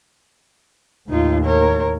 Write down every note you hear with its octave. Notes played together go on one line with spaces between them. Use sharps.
D#2 A2 D#4 F4
A#4 C#5